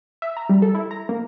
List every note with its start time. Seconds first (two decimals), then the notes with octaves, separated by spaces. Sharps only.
0.22 E5
0.37 A#5
0.49 G3
0.62 A4
0.75 E4
0.91 A#5
1.09 A#3